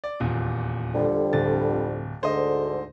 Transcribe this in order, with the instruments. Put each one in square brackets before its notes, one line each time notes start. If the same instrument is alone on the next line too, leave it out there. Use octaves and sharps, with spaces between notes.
[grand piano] D5
D#1 E2 A#2
[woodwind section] F2 D3 G3
[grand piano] D1 A6
[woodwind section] D2 G#2 D3 [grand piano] C5 D#5